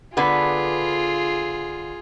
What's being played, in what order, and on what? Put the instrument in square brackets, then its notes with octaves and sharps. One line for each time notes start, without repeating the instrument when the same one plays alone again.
[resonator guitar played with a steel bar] D3 B3 B4 [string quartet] F4 G#4